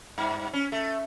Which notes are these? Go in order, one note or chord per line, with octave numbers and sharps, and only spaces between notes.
G2
C#4
A3